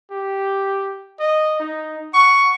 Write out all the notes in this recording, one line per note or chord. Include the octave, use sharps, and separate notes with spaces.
G4
D#5
D#4
F#5 C#6